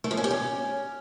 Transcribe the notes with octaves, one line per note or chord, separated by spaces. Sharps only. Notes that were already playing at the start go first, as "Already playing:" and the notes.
A3
F3
C#4
G4
C#4